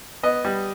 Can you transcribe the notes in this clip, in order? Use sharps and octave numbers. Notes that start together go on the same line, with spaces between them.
B3 D#5
G3